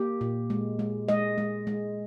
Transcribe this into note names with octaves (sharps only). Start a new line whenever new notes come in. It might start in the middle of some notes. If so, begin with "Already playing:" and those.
Already playing: A#3 G4
A#2
G#3
G#3
G#3 D#5
G#3
G#3